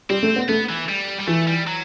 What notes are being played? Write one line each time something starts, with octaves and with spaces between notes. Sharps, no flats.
G3 C4
A3
B3
A3 B3
E3
G3
G3
E3 A3
G3
F#3